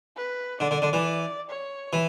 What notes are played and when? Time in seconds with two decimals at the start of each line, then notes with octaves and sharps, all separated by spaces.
0.16 B4
0.60 D3 D5
0.71 D3
0.82 D3
0.93 E3
1.50 C#5
1.93 E3